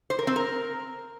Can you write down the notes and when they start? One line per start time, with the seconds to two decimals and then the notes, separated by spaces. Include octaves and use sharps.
0.10 C5
0.19 A#4
0.27 C4
0.36 A#4